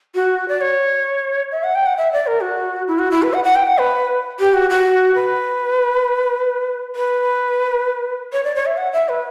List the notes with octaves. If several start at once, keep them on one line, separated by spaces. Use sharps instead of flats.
F#4
D5
C#5
E5
F#5
G5
F#5
E5
D5
A#4
F#4
E4
F#4
E4
B4
F#5
F#5
G5
F#5
B4
G4
F#4
F#4
B4
B4
C#5
D5
C#5
E5
F#5
E5
B4